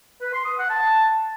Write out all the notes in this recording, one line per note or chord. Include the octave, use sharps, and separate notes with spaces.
B4
C6
D#6
F#5
A5